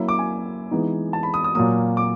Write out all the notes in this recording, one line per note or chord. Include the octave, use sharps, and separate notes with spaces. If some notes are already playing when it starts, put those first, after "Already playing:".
Already playing: F#3 A#3 C#4 E4
D6
G#5
E3 G#3 B3 D#4
A5
B5
D#6
D#6
A#2 F#3 A#3 D#6
D6